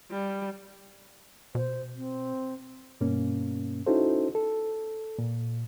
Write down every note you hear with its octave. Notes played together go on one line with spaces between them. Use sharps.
G3
B2 C5
C4
G2 B2 A#3 C#4
C#4 D#4 E4 F#4 A4 C5
A4
A#2